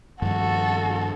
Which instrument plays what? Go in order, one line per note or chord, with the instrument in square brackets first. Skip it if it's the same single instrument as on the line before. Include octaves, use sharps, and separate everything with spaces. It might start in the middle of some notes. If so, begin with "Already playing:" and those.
[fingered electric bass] G2 D#3 F3 [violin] F#4 A4